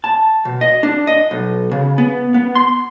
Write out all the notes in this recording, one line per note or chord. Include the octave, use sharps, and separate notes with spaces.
A5
B2
D#5
D4
D#5
B1
C#3
B3
B3
C6